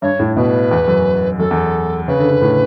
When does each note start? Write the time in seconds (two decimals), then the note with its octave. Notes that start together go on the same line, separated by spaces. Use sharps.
0.02 G2 C#5
0.19 A2
0.36 B2 B4
0.71 E2
0.88 F#2
1.39 F#2 A4
1.51 E2
2.08 C#3 B4
2.19 D3
2.29 C#3
2.42 A2